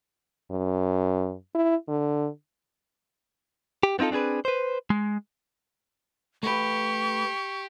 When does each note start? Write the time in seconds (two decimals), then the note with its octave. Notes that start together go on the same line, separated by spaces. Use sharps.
0.51 F#2
1.55 E4
1.88 D3
3.83 G4
3.99 B3 C4 D#4 F4 A4
4.11 C4 D4 G4 G#4 B4
4.45 B4 C5
4.90 G#3
6.43 A3 G4 B4 C#6